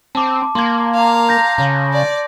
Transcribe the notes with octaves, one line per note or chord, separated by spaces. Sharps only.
C4 A5 D6
A#3 C6 G#6
F5 A#5
G6 A#6
C#3
D5